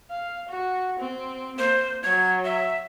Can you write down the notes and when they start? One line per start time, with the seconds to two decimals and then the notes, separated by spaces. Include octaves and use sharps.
0.11 F5
0.49 F#4
1.00 C4
1.58 A#3 C5
2.04 F#3 G#6
2.45 E5